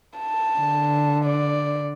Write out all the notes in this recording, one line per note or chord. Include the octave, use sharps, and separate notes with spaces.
A5
D3
D5